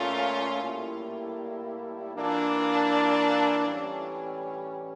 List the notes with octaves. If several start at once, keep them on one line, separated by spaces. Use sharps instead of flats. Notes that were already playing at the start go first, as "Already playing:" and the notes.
Already playing: A#2 A3 C#4 F4
A2 G3 A#3 E4
E3 A#3 D4 F4
A2 E3 G3 C#4